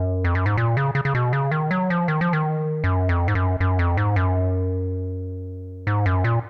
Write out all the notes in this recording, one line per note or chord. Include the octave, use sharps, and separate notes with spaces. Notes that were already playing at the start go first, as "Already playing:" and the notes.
Already playing: F#2
F2
F#2
G#2
A#2
C#3
C#3
C#3
B2
C#3
D#3
F#3
F3
D#3
F3
D#3
F#2
F2
G#2
F#2
F#2
F2
G#2
F#2
G#2
F#2
A#2